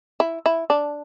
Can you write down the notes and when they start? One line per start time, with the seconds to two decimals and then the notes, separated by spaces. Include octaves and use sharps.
0.20 E4
0.46 E4
0.70 D4